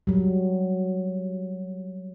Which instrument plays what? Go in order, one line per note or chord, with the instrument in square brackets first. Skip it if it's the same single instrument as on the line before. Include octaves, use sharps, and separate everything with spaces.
[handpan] F#3 G3